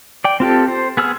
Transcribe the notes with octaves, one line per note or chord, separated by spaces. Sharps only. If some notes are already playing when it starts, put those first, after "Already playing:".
D5 G5
C4 F4 G4 A4
C5
B3 G#4 E6 F6